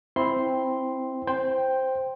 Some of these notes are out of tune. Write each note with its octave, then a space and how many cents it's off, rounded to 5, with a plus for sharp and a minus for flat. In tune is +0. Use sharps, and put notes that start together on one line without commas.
C4 +0 E4 +0 C6 +0
C5 +0 G5 +0